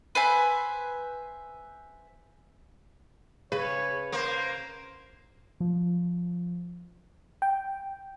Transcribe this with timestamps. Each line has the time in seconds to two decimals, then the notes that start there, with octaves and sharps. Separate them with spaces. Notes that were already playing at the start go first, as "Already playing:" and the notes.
0.15 B4 C5 E5 G#5
3.52 C#3 B4 C#5
4.12 A#3 C5
5.60 F3
7.42 G5